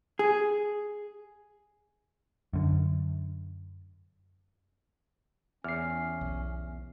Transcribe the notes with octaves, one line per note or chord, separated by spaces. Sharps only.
G#4
F#2 D3
E2 C#4 F6 C7
B1